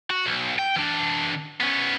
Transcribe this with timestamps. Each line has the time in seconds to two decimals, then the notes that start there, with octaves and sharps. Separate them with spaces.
0.11 F#4
0.26 B1
0.59 G5
0.76 E3 D4
1.60 B3 C#4